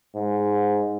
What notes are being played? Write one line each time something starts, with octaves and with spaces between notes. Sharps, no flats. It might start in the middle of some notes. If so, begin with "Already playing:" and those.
G#2